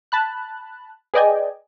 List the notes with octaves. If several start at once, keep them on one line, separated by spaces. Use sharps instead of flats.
A5 B5 F#6
G#4 B4 D5 D#5 G5 G#5